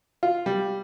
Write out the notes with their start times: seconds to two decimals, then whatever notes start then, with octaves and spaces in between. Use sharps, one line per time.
0.23 F4
0.46 G3